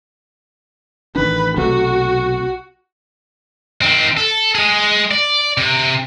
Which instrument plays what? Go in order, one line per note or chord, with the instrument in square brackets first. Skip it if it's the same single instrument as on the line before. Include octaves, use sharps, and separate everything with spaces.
[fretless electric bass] A1 D#3 D4 [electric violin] B4
[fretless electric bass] B1 C3 A3 [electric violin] F#4
[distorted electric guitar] D#3 C4
A4
G#3 G#4
D5
C3